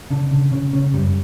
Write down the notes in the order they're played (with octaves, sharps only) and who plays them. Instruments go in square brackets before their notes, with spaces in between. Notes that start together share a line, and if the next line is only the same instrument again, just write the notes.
[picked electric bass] C#3 D4
C#3
C#3 C#4
C#3 C#4
F#2 G3